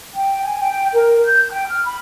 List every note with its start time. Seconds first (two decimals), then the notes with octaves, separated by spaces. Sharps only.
0.14 G5
0.44 G#5
0.60 G5
0.94 A#4
1.24 G6
1.50 G5
1.67 F6
1.85 B5